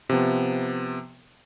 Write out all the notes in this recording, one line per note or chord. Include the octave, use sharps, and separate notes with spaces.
C3 F3 B3